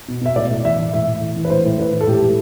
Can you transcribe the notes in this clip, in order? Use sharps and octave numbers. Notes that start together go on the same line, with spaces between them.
B2
B2 E5
A2 D5
A2
E3 E5
E3
A2 E5
A2
E3
E3
B4
A2 C5
A2
E3 B4
E3
A4
A2 G4
A2